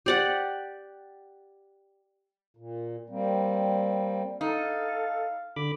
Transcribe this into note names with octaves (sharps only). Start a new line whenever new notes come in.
G4 D5 F#5
A#2
G3 A#3 C4
D#4 A4 F5
D3 B5 D6